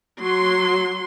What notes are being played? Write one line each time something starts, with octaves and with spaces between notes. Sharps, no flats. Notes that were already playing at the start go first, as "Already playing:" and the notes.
F#3 C6